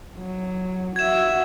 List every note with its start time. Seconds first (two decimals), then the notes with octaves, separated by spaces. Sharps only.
0.18 F#3
0.96 F#4 E5 G#6 E7